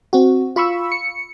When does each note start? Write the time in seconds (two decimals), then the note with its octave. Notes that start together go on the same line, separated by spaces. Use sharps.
0.13 C4 F#4
0.56 F4 B5 C#6 E6
0.92 C#7